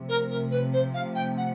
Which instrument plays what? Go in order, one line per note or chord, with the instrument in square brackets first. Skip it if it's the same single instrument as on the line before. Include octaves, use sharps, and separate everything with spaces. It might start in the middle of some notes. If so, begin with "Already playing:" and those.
Already playing: [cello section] C3 F3 A3
[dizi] A#4
A#4
B4
C5
F5
G5
F#5